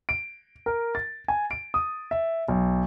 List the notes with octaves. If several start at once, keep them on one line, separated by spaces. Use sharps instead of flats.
D7
A#4
A6
G#5
D7
D#6
E5
B1